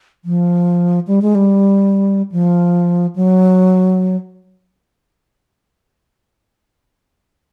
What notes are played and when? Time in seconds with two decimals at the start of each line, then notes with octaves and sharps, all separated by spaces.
0.25 F3
1.07 G3
1.22 G#3
1.35 G3
2.32 F3
3.16 F#3